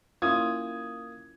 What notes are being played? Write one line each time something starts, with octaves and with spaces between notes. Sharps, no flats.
A#3 C#4 E4 F4 D#6 G#6